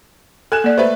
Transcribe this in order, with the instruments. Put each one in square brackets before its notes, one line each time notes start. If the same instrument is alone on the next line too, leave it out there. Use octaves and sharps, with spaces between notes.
[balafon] A4 [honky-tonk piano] G#5 F#6 E7
[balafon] A#3 D5
[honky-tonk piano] A3 B4 [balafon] C5